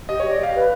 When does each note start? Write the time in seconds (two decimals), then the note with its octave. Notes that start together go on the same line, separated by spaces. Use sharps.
0.08 G4 D#5
0.20 C#5
0.24 D#5
0.31 D5
0.39 G4 F5
0.54 B4